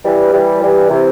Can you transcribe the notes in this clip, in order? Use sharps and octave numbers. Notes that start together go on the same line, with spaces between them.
E3 G3
E3 G3
E3 G3
C3 E3